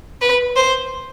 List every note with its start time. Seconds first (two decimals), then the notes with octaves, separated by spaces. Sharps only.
0.21 B4
0.56 C5